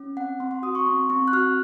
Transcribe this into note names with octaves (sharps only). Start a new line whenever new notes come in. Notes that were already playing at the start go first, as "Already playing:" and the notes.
Already playing: C#4
C4 F#5
C4 C6
C6
F#4 D#6
C#6
C4 C6
C4 C#6
F#6
F#4 F6